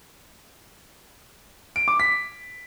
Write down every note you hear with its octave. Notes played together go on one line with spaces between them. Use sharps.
D7
D6
B6